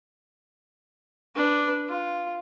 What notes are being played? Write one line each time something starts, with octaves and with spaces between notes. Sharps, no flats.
D4 B4
F4